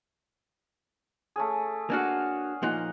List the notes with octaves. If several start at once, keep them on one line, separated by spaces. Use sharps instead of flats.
A3 C#4 G#4
A#3 D4 F#4 F5 F#5 G#5
A#2 F3 D#4 F#5